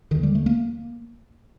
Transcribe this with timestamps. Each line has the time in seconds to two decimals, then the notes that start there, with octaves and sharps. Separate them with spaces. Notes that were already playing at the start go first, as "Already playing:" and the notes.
0.11 D#2 D3 D#3
0.23 G3
0.35 A3
0.46 A#3